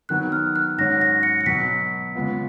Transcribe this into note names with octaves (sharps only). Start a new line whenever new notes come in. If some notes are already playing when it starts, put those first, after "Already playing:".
D#3 F#3 B3 F#6
F6
F#6
G#2 F#3 C#4 F#4 C#5 A#6
A#6
C#7
C#7
B2 F#3 B3 B6
C#3 G#3 B3 F4